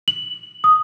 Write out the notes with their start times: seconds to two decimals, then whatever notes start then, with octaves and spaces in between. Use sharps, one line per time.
0.08 F#7
0.64 D#6